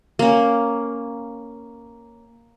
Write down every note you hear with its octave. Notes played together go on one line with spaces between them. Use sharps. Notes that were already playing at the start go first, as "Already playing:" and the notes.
A#3 C#4